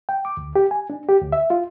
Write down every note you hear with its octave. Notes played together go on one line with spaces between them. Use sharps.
G5
D6
D2
G4
G#5
D4
G4
D2
E5
F4